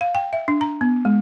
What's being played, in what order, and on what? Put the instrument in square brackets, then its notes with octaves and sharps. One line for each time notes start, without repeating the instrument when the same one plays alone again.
[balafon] F5
G5
E5
D4
A#5
B3
G#3